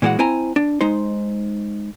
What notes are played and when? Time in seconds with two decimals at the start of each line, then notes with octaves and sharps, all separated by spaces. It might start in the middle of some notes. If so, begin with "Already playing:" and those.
0.02 A#2 E3 G#3 F#4 G#4 F#5
0.19 C4 E4 C5 G#5 A#5
0.56 D4
0.81 G#3 D#4 C5